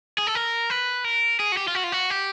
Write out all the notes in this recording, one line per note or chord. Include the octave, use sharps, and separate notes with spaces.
G#4
A4
A#4
B4
A#4
G#4
F#4
G4
F4
F#4
F4
F#4
G4